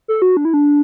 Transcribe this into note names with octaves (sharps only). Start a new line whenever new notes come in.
A4
F#4
D4
E4
D4